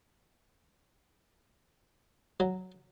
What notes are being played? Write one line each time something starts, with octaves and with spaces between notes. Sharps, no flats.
F#3